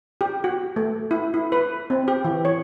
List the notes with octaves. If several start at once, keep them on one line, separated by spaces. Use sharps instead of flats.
G4
F#4
A3
E4
E4
B4
C4
G4
E3
C#5